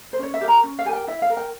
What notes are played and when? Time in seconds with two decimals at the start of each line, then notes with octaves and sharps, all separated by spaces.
0.13 C5
0.19 C#4 C#5
0.34 E5
0.41 G4 A#4
0.48 A#5
0.63 C#4
0.79 F5
0.85 G4 G#5
0.89 A#4 G5
1.07 E4 E5
1.22 F5
1.30 A#4
1.37 G5